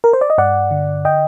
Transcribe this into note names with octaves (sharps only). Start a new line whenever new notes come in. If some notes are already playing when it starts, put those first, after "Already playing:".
A#4
C5
D5
D#5
G2 D5 F#5
D3
D#5 G5